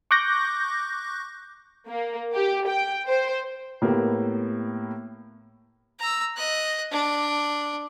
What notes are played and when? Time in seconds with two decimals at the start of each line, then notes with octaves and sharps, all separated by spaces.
0.11 C#6 D6 F#6 G6 A#6
1.88 A#3
2.34 G4
2.67 G5
3.07 C5
3.82 A2 A#3 B3 G4
6.00 A#5 E6
6.37 D#5 F#6
6.92 D4